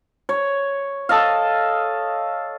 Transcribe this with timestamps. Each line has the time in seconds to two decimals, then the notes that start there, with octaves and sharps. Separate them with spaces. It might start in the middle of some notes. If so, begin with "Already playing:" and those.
0.29 C#5
1.09 A4 D#5 F5